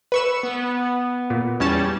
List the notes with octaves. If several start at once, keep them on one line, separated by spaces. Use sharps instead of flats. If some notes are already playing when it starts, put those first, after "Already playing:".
B4 C#6 E6
B3
A#2
E2 G3 C#4 A5